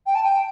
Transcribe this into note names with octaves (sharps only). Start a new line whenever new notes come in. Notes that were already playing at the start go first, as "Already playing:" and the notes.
G5
A5
G5